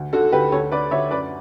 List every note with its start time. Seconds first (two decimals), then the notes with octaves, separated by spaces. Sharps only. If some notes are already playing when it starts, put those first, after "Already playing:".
Already playing: D2
0.13 D3 F#4 A4
0.32 D2 G4 B4
0.52 D2 A4 C#5
0.71 D3 B4 D5
0.91 D2 C#5 E5
1.11 F#2 B4 D5